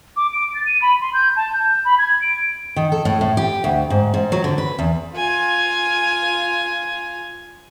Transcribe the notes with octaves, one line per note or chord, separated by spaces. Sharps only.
D6
D7
A6
D#7
B5
C6
G6
A5
G6
B5
G#6
D7
D#3
A4
A2
A2
G4
D2
G#2
G#2
F#3
D3
B4
E2
F4 G#5